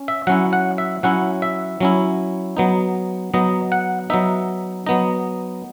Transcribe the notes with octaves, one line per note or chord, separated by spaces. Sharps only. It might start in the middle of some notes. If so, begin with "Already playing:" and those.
Already playing: C#4
E5
F#3 C#4 E4 F#5
F#5
E5
F#3 C#4 E4 F#5
E5
F#3 C#4 E4
F#3 B3 D#4
F#3 B3 D#4 D#5
F#5
F#3 B3 D#4 E5
F#3 B3 D#4 D#5